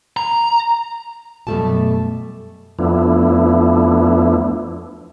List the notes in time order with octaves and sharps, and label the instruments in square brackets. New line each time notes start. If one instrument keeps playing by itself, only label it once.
[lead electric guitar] A#5
[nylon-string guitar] F#2 B2 G3 A3 G4 A5
[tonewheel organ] F2 F3 A3 B3 D4 E4